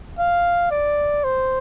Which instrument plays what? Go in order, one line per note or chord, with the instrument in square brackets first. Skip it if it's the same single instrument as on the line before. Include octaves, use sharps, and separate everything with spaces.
[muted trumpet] F5
D5
C5